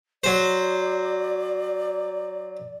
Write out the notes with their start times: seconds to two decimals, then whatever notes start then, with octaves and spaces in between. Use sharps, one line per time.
0.24 F#3 C5 D5